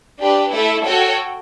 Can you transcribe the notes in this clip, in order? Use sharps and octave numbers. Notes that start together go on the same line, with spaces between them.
D4 G4 B4
A3 E4 A4 E5
F#4 A4 C#5 G5